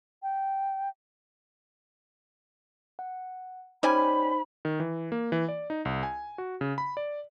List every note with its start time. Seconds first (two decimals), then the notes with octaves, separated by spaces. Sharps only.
0.23 G5
2.99 F#5
3.83 G3 C#4 D#4 C5 G#5 B5
4.65 D#3
4.80 E3
5.12 A#3
5.32 E3
5.49 D5
5.70 D#4
5.85 C2
6.03 G#5
6.38 F#4
6.61 C#3
6.78 B5
6.97 D5